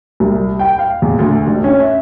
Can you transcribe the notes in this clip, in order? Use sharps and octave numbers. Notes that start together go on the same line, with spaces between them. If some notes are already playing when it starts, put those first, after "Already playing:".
C2
G5
F5
E2
D2
A1
C#4
E5